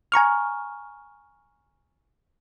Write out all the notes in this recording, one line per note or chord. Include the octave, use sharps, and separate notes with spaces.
G#5 A#5 C#6 F6